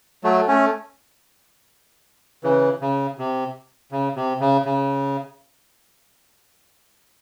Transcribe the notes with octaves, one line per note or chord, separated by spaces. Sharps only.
F#3 A3
A3 C#4
C#3 E3
C#3
C3
C#3
C3
C#3
C#3